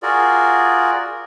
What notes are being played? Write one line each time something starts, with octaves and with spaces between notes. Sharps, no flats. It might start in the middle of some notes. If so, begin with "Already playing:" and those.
F4 F#4 G#4 A#4 D5